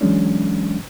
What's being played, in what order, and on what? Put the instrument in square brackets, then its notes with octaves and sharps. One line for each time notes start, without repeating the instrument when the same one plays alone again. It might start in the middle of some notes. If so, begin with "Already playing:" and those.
[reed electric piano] E3 F#3 G#3 C#4 D4